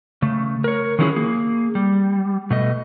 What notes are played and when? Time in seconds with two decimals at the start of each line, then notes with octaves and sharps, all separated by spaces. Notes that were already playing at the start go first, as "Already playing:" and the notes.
0.22 C#3 A3
0.64 A#4 C#5
0.99 D#3 F3 F#3 C#4 E4 G#4
1.16 A#3 G#4
1.75 G3
2.51 B2 A3 D#5